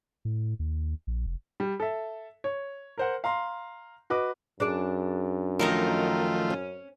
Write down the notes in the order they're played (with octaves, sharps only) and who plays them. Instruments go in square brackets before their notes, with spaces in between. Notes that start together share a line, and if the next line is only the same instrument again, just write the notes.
[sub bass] A2
D#2
A#1
F1
[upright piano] G3
A4 E5
C#5
A#4 C5 F#5
F5 A#5 C6
F#4 B4 D#5 D6
[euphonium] F#2 [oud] D4 G#4 D5
[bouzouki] D#3 D#4 A#4 [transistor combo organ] F3 A3 F4
[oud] C#4